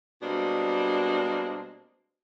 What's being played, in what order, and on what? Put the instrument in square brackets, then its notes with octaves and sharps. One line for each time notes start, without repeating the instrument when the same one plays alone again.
[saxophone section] B2 G3 G#3 A#3 C4 D4